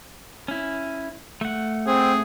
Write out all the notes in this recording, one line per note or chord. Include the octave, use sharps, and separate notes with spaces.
C#4 E4
A3 F#5
C4 G#4